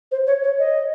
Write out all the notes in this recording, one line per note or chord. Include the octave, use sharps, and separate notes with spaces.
C5
C#5
C#5
D#5